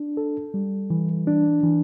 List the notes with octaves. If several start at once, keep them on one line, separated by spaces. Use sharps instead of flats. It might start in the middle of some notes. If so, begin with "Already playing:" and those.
Already playing: D4
A4
G3
E3
D4
E3